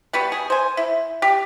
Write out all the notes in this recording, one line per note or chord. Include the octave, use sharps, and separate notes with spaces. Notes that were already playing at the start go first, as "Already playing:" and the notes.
G3 B3 F#4
G#4
C5 G#5
E4
G4